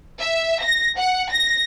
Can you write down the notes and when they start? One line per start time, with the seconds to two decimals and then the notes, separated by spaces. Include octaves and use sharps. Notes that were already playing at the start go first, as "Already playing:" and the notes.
0.20 E5
0.63 A#6
0.98 F#5
1.31 A#6